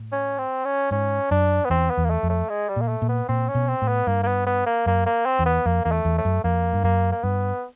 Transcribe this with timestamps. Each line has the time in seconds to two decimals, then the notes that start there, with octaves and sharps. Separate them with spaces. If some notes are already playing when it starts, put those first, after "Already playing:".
Already playing: A2
0.12 C#4
0.38 C4
0.65 C#4
0.91 G#2 C#4
1.31 F#2 D4
1.65 B3
1.70 E2 C4
1.90 B3
1.97 E2
2.05 A#3
2.10 A3
2.23 F2
2.29 A3
2.50 G#3
2.69 G3
2.76 A#2 A#3
2.88 A3
3.02 A#2
3.09 B3
3.29 A#2 C4
3.48 C#4
3.55 B2
3.68 C4
3.82 A2
3.88 B3
4.07 G2 A#3
4.23 A#3
4.27 B3
4.47 B3
4.66 A#3
4.86 F#2 A#3
5.06 A#3
5.26 C4
5.39 E2
5.46 B3
5.66 F2 A#3
5.85 E2 A#3
5.92 A3
6.05 E2
6.18 A3
6.25 F#2
6.44 F2 A#3
6.73 G2
6.84 F#2 A#3
7.12 A#3
7.23 G2 B3